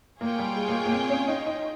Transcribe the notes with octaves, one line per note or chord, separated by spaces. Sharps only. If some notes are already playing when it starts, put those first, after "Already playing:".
A#3 F4 G#4 C#5 G5
G3
G#3
A#3
G#3
A#3
C4
C#4
D#4
D#4